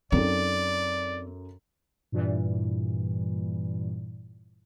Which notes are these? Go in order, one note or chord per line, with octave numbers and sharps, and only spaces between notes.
F#2 C4 D#4 A4 D5
G2 A#2 E3 G3